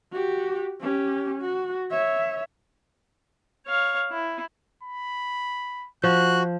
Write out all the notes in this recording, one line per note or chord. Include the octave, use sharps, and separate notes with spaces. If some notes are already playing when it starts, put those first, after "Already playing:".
F#4 G4
C#4 G4
F#4
C#5 E5
C#5 F5
E4
B5
F3 F#4 F#6